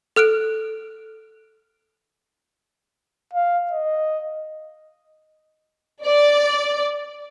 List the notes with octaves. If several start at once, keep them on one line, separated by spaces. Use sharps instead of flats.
A4 F6 F#6 D7
F5
D#5
D5